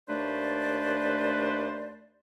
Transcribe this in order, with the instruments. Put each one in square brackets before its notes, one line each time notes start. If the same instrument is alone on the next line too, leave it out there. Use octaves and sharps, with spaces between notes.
[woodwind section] D#2 A3 D4 B4 C5 D5